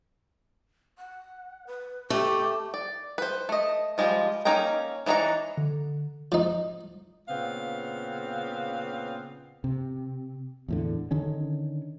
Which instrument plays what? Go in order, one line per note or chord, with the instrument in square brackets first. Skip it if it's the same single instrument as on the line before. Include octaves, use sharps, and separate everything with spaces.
[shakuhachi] F#5
B4
[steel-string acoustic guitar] A3 [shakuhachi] G4
[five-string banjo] D5
B4 C5
A3 D#5
F3 G3 G#3 F4
A#3 C#4 D#4 G5 A#5
E3 D4 D#4 C#5 A#5
[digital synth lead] D3
[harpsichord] F3 D#4
[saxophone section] A#2 C#3 B3 C4 F5
[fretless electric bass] C3
E2 A2 D3
D3 D#3 C#4